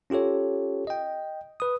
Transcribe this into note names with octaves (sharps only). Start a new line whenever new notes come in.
C#4 F4 G4 A4 C#5
D#5 G5
B4 D#6